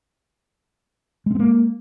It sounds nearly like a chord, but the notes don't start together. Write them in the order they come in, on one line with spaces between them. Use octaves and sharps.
G#3 C#4 C4 A#3